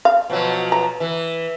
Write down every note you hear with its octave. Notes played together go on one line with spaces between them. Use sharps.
F5
B2 F3 F#3
A#5
E3